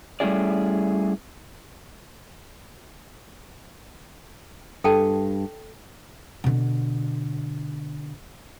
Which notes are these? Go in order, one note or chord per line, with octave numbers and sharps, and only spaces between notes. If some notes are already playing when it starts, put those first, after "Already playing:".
G3 A3 C#4 E4 G#4 D5
G2 A4 G5 A5
B2 D3